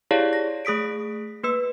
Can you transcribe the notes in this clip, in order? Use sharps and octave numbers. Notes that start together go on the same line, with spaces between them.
E4 G4 G#4 C#5 D5 F5
A#6
A3 G#4 D#6 B6 D7
A#3 B4 E6